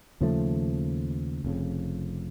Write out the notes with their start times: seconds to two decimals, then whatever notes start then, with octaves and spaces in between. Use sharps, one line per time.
0.21 D#2 C#3 F3 A3
1.44 F1 F2 C#3